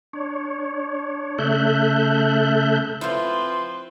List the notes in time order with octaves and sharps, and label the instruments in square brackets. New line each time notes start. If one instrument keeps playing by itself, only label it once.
[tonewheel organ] D4 C#5
C#3 A3 A4 E5 F#6 G6
[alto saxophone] F3 [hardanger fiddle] C4 B4 [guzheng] E4 F4 [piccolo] C6